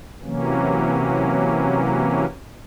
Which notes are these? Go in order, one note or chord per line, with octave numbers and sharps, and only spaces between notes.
C3 E3 F#3 A#3 C#4